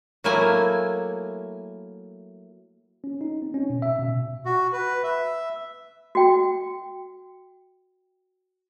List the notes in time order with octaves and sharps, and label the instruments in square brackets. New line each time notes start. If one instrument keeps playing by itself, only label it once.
[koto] F#3 A3 A#3 E4 G#5
[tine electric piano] C#4
D#4
C4
C#4
B2
E5
B2
[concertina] F#4
B4
E5
[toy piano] F#4 G5